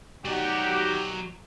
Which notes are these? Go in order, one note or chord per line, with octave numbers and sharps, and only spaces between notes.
F#3 D#4 F#4 G4 D5